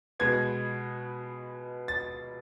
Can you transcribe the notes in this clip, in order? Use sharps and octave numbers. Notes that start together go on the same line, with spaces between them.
B2 G#3 B3 G#6
A6